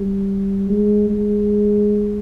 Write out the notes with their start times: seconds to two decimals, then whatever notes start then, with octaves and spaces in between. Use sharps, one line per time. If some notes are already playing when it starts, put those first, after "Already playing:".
Already playing: G3
0.69 G#3
1.10 G#3